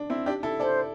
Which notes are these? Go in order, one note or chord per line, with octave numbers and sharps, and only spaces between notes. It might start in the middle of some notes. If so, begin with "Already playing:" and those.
Already playing: D4
C4 E4
D4 G4
E4 A4
A4 C5 D5